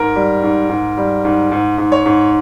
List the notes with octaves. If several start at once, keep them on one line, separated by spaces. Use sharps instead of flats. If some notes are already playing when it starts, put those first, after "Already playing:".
Already playing: G#2 A#4
G3
G#2
G#2
G3
G#2
G#2
G#2
C#5
G#2